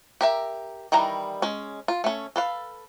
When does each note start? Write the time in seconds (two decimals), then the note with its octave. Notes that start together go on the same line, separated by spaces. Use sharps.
0.21 G4 A#4 E5
0.92 D#3 E3 G3 A#5
1.42 G#3 C#4
1.88 F4
2.04 A3 C#4
2.36 A4 B4 F5